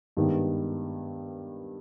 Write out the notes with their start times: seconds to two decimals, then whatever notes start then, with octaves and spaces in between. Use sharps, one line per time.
0.17 G2 D#3 G#3 B3